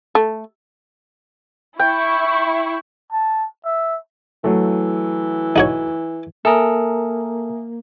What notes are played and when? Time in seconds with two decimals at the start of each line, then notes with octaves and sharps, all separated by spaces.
0.15 A3
1.79 E4 G5 C#6
3.12 A5
3.65 E5
4.44 E3 F#3 A3
5.56 D#4 F#4 C#5
6.45 A#3 A4 A#4 E5 G#5 D#6